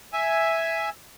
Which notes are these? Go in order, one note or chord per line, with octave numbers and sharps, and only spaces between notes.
E5 G#5